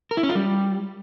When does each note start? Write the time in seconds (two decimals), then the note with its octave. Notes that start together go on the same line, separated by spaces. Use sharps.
0.11 A#4
0.17 E4
0.23 C#4
0.29 F4
0.35 G3